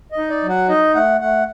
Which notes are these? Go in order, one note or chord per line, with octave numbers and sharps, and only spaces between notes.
D#5
D#4
D5
F#3
F#5
D#4 D#5
A3 F#5
A3 F#5